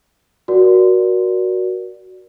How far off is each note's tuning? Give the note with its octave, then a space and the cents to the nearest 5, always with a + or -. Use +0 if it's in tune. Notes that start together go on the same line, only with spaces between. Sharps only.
F#4 +0 A#4 +30 D5 +0